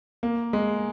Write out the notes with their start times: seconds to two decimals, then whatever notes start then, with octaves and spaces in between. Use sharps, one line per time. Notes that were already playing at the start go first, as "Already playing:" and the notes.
0.23 A#3
0.53 G#3